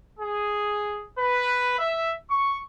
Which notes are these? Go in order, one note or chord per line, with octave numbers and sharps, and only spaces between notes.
G#4
B4
E5
C#6